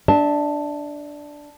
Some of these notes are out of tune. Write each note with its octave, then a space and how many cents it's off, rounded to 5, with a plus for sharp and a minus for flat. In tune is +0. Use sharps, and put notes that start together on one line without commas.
D4 +0 E5 -35 A5 +0